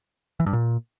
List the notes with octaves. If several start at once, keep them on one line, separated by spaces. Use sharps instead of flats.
E3
G2
A#2